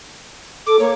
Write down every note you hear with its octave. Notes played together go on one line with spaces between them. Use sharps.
A4 D6
A#3 C#5